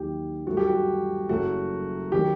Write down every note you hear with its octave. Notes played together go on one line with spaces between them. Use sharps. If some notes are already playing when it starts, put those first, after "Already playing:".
Already playing: D#2 D#3 F#3 G4
G2 F#3 A3 F#4
G4
F#4
F#1 F#2 F#3 A3 F#4
D#3 F#3 A3 G4